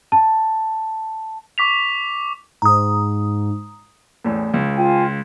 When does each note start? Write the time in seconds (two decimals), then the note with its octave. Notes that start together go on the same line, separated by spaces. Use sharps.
0.12 A5
1.58 C#6 D6 B6 F7
2.62 G#2 A#5 D#6
4.24 A1 E2 A2
4.54 C#2
4.75 F4 G5 G#5